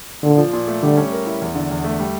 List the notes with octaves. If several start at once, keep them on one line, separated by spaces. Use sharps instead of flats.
A#2 D3
F3
A#2
A3
D3 G3
C#4
A#4
E4
E2
D3
E2
A3
G3